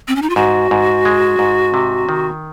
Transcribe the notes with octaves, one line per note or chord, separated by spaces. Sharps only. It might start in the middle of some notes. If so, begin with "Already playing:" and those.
C4
C#4
D#4
F4
G#2 F#4
G#2
G#3
G#2
C3
D#3